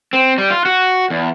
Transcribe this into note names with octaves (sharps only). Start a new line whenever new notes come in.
C4
G3
F4
F#4
E2